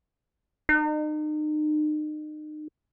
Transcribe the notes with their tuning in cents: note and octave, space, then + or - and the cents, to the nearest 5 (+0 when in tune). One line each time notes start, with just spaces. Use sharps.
D#4 -35